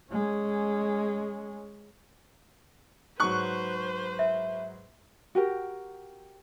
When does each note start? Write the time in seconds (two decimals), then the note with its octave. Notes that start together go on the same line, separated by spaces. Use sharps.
0.12 G#3 C#4
3.20 G#2 F#3 B4 C5 C#6 F#6
4.19 E5
5.35 F#4 G4 A#4